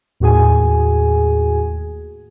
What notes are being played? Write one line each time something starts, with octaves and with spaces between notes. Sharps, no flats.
D#2 A2 F#4 G#4 G#5